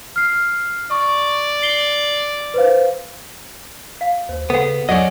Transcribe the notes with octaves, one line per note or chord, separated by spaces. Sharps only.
F6 C7
D5 C#6
C7 G7
B4 C5 F5
F5
D#2 C5
C#3 B3 A4 C#5 F#5
E2 F#3 C#4 D5 D#5